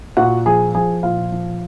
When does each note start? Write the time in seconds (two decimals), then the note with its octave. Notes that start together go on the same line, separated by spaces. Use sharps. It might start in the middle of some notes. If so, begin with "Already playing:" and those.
0.17 A#2 F#4 F#5
0.46 F3 G#4 G#5
0.75 F3 G#4 G#5
1.03 A#2 F4 F5
1.32 F3